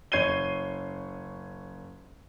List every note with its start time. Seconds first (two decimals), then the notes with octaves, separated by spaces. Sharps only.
0.12 F#1 C#5 G#6 C7 D#7 G7